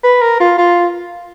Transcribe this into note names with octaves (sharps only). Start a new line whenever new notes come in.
B4
A#4
F4
F4